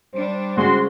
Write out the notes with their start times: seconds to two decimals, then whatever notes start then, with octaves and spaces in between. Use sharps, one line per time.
0.15 G3 D4 C5
0.57 C#3 G#3 F#4 C6